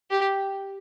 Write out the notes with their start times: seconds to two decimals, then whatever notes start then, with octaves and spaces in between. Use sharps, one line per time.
0.10 G4